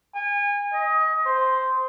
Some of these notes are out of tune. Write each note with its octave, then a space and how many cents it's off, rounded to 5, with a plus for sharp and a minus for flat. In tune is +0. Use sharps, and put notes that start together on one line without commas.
G#5 -30
D#5 +25
C5 -5